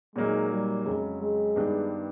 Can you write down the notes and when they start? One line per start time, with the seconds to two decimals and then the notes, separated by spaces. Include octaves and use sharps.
0.15 A#2 F#3 G#3 A#3 D#4
0.51 G3
0.85 F2 C#3 F#3 G#3
1.21 G#3
1.56 G2 D#3 G3 B3 D4